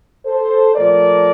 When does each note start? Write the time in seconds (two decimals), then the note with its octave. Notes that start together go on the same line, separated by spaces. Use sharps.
0.26 A4 C5
0.74 A#2 F3 A3 A#4 D5